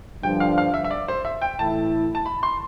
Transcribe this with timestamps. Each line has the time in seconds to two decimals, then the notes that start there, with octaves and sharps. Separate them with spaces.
0.23 G2 D3 F3 G5
0.40 F5
0.58 F5
0.74 E5
0.84 E5
0.91 D5
1.08 C5
1.25 E5
1.42 G5
1.59 A2 E3 A3 E4 A5
2.15 A5
2.26 B5
2.43 C6